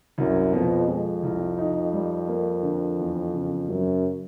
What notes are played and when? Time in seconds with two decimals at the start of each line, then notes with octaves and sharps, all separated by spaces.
0.18 C2 F#2
0.53 F2 B2
0.88 F2 G#3
1.23 C2
1.58 D#4
1.93 G3
2.28 A#3
2.63 D3
2.98 E2
3.34 C#3
3.68 F#2 F#3